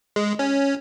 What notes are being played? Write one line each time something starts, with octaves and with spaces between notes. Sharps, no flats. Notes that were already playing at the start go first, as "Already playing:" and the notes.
G#3
C#4